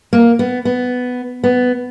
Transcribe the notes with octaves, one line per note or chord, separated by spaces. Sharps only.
A#3
B3
B3
B3